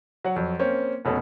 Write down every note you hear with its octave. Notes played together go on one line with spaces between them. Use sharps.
F#3 F#5
F2 F#3
A#3 C4 C#4
F1 B2 C#4 A4